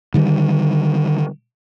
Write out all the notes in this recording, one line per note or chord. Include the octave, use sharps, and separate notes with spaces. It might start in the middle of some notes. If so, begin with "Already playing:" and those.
D3 D#3 G3